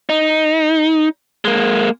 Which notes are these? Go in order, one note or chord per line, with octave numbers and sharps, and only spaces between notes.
D#4
G#3 A#3